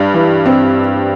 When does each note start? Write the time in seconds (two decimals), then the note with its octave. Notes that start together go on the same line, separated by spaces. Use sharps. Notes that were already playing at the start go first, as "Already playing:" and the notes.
Already playing: G2 G3
0.14 E3
0.46 C4